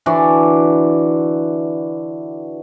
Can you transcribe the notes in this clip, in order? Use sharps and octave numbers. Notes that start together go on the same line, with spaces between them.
D3 E3 F#4 D5